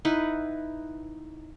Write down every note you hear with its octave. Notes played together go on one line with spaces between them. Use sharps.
D#4 E4 B4 F#5